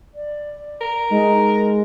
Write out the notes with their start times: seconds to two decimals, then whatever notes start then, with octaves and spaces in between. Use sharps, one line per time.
0.14 D5
0.81 A#4
1.11 G#3 D#4